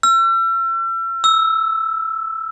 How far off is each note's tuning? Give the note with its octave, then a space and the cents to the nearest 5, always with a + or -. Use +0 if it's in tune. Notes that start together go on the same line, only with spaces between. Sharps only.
E6 +40
E6 -10